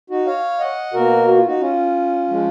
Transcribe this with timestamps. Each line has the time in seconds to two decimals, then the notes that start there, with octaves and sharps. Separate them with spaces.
0.10 D#4 F#4
0.26 C#5 F5
0.60 D#5 F#5
0.93 B2 A#3 F#4 A#4
1.28 F#4
1.36 F4
1.46 D#4 F#4
1.60 C#4 F4
2.29 F3 G#3